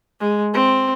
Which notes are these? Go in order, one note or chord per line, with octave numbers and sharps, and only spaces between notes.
G#3
C4